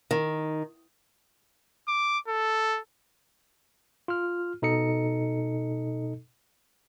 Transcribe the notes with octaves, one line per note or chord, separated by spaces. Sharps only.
D#3
D6
A4
F4 F6
B2 D#4 A4 D#5 C#7